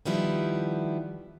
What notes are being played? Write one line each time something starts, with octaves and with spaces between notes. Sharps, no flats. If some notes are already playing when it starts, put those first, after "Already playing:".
D#3 F3 G3 B3 E4